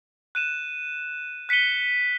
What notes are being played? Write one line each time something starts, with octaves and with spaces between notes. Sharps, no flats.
F#6 D#7 E7
F#6 B6 C#7 D#7 G7